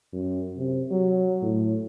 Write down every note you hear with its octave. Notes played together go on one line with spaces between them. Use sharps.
F#2
C3
F#3
A2